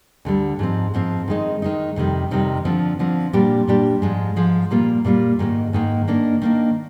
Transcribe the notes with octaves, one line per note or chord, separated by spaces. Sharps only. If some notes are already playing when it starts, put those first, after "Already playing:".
D2 D3 G3
G#2 F3 C4
G#2 F3 C4
D#3 G#3 D#4
D#3 G#3 D#4
F2 C3 D#3 G3
F2 C3 D#3 G3
D3 F3 C4
D3 F3 C4
A#2 G3 D4 G4
A#2 G3 D4 G4
G#2 F3 G#3
G#2 F3 G#3
A#2 G3 A#3 F4
A#2 G3 A#3 F4
G#2 D#3 A#3
G#2 D#3 A#3
D#3 A#3 D4
D#3 A#3 D4